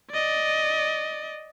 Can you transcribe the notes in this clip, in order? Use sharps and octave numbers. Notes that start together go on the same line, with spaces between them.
D5 D#5